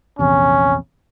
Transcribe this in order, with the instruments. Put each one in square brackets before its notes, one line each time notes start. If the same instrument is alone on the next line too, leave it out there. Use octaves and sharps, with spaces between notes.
[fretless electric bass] A#1 E2 C3 [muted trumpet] C#4